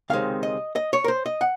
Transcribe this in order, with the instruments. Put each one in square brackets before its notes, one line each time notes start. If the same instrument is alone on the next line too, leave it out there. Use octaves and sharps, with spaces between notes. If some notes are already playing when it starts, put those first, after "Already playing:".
[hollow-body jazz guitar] C#2 C3 D#3 G#3 C4 F5
D#5
D#5
C#5
A#4
C5
D#5
F#5